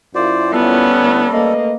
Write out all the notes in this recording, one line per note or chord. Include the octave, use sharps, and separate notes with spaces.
F#2 E4 F4 C5 D5
G3 B3 C#4 A4
D3 A3 E4
A3 A#3 B4 D#5